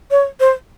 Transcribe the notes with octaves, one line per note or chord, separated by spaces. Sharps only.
C#5
C5